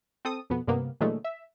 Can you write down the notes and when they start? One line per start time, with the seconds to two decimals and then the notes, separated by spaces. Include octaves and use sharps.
0.25 C4 A4 D#6
0.50 F2 B2 B3
0.67 G2 C3 A#3 B3
1.00 A#2 D3 E3 F#3 G#3 A3
1.24 E5